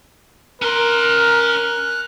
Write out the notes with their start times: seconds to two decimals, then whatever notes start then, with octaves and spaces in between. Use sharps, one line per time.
0.62 C#4 A#4 C6 F6 F#6